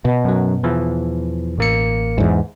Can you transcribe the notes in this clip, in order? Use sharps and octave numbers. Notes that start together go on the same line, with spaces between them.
B2
F#2 F#3
E2 E3 F3
A1 A#3 C#7
E2 G#2